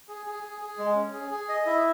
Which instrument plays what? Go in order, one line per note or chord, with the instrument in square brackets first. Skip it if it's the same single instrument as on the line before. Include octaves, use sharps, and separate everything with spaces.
[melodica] G#4
G#4
G#4
G#4
G#3
C#4
G#4
G#4
D#5
E4